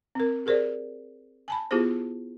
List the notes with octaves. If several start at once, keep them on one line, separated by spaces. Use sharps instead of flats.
C4 A#4
G4 G#4 A#4 C5 D5
G#5 A5 B5
B3 E4 F4 G4 G#4 C5